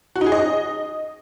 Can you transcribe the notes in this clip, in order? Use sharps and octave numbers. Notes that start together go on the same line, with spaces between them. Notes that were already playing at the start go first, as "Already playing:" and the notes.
F#4
D#4
G#4
D#5